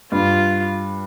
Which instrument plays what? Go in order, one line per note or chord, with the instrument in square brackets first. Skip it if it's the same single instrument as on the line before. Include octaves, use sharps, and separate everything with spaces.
[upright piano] G2 [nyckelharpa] F4